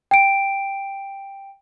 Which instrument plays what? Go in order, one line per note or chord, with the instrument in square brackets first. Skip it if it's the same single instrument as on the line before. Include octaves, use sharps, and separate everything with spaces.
[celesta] G5 D7